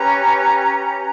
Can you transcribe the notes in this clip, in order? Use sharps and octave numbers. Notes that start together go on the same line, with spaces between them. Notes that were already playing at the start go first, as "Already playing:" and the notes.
Already playing: C#4 G4 B4 A#5